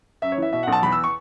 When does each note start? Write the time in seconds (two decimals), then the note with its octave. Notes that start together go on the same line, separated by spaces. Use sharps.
0.22 F#2 E5
0.32 C#5
0.38 E3 E5
0.53 B2 E5
0.63 F#5
0.67 B1
0.72 A5
0.83 E2 B5
0.92 E6
1.04 C#6